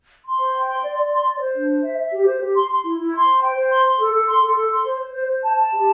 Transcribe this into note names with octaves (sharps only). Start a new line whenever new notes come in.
C6
C5
G5
C6
D5
D5
C6
D5
C5
D4
C5
E5
E5
G4
C5
G4
C6
C6
E4
E4
C6
C5
G5
C5
C6
C6
A4
A4
C6
A4
A4
C6
C5
C5
C5
C5
A5
A5
G4